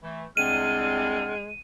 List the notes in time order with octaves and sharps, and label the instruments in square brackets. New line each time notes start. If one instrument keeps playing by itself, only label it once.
[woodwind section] E3 A3
[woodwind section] C2 C3 C4 [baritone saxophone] G#3 [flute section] D4 F#5 F6 [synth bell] D#7